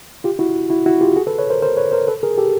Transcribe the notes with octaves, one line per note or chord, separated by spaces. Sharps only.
F4 G4
E4 F#4
E4 F#4
E4 F#4
F4 G4
F#4 G#4
A4 B4
B4 C#5
A#4 C5
A#4 C5
B4 C#5
A#4 C5
A4 B4
G#4 A#4
G4 A4